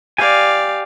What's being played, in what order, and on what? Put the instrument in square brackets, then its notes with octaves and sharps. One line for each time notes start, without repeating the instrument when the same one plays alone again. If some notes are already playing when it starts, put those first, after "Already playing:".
[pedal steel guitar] G4 G#5 [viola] D5 F5